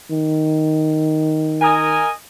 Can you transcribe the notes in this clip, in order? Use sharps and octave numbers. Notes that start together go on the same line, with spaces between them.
D#3
A#4 D#5 G#5